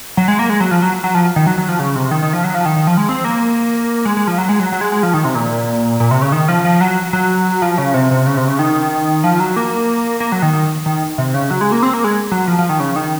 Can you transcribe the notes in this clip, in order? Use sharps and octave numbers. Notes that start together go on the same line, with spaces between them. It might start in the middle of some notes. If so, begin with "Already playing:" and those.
F#3
G#3
A#3
G#3
F#3
F3
F#3
F#3
F3
D#3
F#3
F#3
F3
C#3
C3
D#3
D#3
F3
F#3
F3
D#3
D#3
F3
G#3
C4
A#3
G#3
G#3
F3
F#3
G#3
F#3
F#3
G#3
G#3
F3
D#3
C3
A#2
A#2
C3
C#3
D#3
F3
F3
F#3
F#3
F3
C#3
C3
C3
C#3
C3
C#3
D#3
F3
F#3
A#3
A#3
F#3
D#3
D#3
D#3
C3
C#3
F#3
G#3
A#3
C4
A#3
G#3
F#3
F3
F3
D#3
C#3
D#3